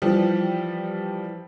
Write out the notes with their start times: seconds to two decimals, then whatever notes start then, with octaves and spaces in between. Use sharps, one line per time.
0.02 E3 F3 G3